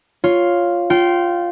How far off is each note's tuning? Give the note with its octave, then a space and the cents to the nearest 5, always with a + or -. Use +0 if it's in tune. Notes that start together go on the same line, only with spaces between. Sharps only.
F4 +0 C#5 +0
F4 +0 G5 -25